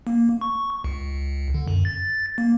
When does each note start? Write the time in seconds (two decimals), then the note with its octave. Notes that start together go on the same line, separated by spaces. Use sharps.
0.07 A#3
0.41 C#6
0.84 C#2
1.54 D3
1.68 F#2
1.85 A6
2.38 A#3